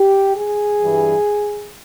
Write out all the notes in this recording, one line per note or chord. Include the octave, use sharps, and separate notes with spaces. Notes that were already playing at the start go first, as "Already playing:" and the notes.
Already playing: G4
G#4
G2 E3 G3